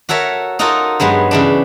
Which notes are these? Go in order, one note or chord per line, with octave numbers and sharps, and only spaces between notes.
F#4 A4 A#4 C#5 E5
D#4 F4 F#4 A4 A#4 D#5
G2 F#3 G#3 B3
C#3 E3 D4